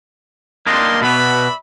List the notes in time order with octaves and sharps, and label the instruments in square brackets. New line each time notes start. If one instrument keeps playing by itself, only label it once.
[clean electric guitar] A#3 D4 D#5 [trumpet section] D5 G5 C6
[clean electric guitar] B2 B3 [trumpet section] D5 E5 B5